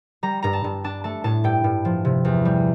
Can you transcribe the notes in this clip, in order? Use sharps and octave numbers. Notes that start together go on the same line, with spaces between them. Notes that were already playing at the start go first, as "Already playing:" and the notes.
G3 A#5
G2 A#5
A5
G2
D4 A5
A3 A5
A2 A5
G2 G5
G2
F3
C3
E2
G3